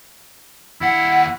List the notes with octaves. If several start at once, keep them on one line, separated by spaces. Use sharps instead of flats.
D#2 E4 F#5